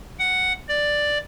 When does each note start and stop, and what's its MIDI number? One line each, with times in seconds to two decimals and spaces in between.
0.19 0.53 78
0.68 1.18 74